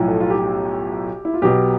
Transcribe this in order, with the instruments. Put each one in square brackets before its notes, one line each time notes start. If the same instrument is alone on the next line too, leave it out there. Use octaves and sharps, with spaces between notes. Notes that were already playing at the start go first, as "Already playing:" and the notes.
Already playing: [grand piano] B1 A2 F3
A4
F4
G4
E4
F4
B1 B2 G4